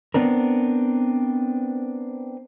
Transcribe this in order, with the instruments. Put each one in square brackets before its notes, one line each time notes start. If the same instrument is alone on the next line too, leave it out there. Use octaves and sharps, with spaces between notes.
[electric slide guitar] B3 C4 D4 A#4